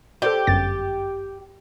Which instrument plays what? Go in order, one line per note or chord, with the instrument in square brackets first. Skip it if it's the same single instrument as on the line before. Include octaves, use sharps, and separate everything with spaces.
[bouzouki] G4 [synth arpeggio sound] A4 C5 D5
[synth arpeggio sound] G1 F#2 A6